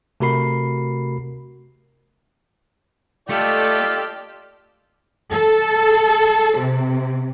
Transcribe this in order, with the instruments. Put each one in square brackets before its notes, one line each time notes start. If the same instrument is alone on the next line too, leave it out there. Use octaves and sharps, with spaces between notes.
[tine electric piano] C3 A3 F#4 A#4 B5 C7
[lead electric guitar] A3 [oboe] F4 [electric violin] G4 A4 [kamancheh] D5 D#5
[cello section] A4
C3